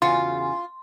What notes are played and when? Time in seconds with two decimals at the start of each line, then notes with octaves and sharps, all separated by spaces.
0.02 E2 C#3 F4 F#4 C6